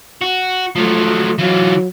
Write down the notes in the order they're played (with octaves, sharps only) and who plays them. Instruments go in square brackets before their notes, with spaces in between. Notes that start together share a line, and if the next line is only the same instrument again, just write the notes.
[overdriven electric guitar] F#4
[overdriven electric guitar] F3 F#3 [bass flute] A3
[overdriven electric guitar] E3 F4 [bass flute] F#3